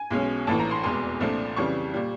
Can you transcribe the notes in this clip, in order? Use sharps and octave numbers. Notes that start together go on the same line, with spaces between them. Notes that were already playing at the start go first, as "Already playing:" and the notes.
Already playing: G#5
B1 B2 G#3 C#4
A#1 A2 E3 A5
A#5
C6
F1 E2 B2 G#3 C6
C2 A#2 F3 A3 D4
F2 C#3 E3 G3 C#6
A#2 G3